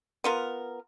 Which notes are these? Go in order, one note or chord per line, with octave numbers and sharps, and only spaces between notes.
B3 F4 A#4